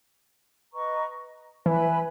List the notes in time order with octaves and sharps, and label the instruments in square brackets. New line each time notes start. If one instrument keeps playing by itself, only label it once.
[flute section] B4 D#5 A#5 C#6
[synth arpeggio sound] E3 [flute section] B4 E5 G#5 B5